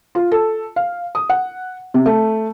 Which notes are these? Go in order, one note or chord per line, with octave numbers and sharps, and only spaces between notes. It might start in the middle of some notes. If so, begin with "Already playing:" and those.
F4
A4
F5
D#6
F#5
C3
A3